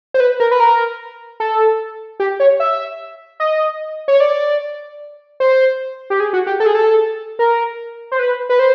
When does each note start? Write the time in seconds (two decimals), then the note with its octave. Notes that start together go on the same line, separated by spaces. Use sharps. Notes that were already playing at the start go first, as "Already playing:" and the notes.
0.14 C5
0.20 B4
0.40 A#4
0.51 B4
0.60 A#4
1.40 A4
2.20 G4
2.40 C#5
2.60 E5
3.40 D#5
4.08 C#5
4.20 D5
5.40 C5
6.10 G4
6.20 G#4
6.33 F#4
6.47 G4
6.60 A4
6.66 G#4
6.75 A4
7.39 A#4
8.12 C5
8.19 B4
8.50 B4
8.59 C5